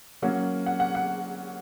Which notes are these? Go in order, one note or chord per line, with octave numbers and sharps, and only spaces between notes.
F#3 A#3 C#4 F#5
F#5
F#5
F#5